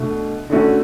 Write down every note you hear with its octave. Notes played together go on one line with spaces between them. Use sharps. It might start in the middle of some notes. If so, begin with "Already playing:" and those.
Already playing: B2 A3 D4
D3 A3 C#4 F#4